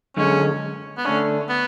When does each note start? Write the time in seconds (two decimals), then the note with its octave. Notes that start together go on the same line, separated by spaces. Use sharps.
0.17 F#2 D3 G#3 C#4
0.98 B3
1.05 D3 A3 C#4 D4
1.49 B3